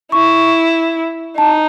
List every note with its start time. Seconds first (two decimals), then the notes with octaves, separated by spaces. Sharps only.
0.12 E4 C#6
1.37 D#4 A5